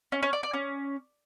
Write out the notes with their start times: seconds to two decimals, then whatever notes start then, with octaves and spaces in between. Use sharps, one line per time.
0.12 C#4
0.23 C#4
0.33 D5
0.43 D5
0.53 C#4